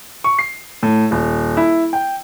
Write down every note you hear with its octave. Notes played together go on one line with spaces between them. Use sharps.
C#6
C7
A2
D#1
E4
G5